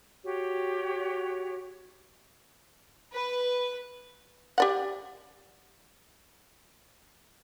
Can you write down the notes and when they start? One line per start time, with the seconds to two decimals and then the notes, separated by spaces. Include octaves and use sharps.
0.24 F#4 G4 C#5
3.12 B4
4.58 G4 D5 F#5